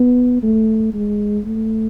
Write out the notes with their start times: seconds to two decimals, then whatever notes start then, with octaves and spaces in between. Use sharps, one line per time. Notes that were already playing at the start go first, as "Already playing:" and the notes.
Already playing: B3
0.43 A3
0.94 G#3
1.45 A3